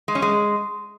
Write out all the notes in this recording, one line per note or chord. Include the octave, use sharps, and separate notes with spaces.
G#3
C#4
G#3